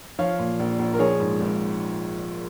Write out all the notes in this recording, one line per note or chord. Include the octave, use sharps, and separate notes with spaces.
F3 C#5 F5
A#2
A#1
A#1
A#4
F3 G#4 C#5
G#2
G#1